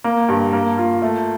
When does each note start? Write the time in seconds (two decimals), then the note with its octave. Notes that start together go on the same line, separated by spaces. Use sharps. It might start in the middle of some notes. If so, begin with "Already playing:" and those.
0.04 A#3
0.29 G2
0.53 A#3
0.78 F4
1.02 A3